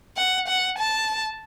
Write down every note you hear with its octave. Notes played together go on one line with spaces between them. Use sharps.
F#5
F#5
A5